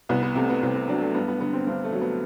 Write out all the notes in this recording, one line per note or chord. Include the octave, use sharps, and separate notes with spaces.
C2 B3
B3
C3 A3
B3
C2 C4
B3
F#3 D4
A3
G2 B3
B3
D3 B3
C4
G2 C4
A3
F#3
B3